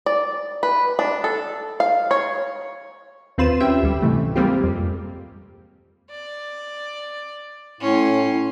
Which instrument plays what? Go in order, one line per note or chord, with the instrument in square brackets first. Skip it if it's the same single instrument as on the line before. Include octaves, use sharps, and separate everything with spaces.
[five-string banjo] D5
B4
D4
A4
F5
C#5
[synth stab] D#2 C4 F4 B4 C6 E7
C#4 G4 E5 G5
D2 G3
G#2 C3 E3 A3
G3 G#3 A#3 C4 F4 G4
F2
[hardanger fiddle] D5
[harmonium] A2 [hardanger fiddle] C#4 C6